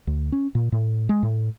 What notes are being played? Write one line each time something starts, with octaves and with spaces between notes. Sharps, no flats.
D2
C#4
A#2
A2
G#3
A2